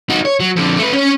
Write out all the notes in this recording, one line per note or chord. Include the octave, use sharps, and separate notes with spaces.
D#4 F#4
C#5
F#3
F2 D3
A3 B4
C#4 C#5